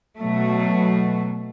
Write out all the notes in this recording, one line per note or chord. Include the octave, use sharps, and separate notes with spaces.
B2 F#3 A3